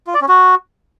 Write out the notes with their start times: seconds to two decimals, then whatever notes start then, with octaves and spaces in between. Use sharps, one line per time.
0.07 F4
0.14 D5
0.21 C#4
0.28 F#4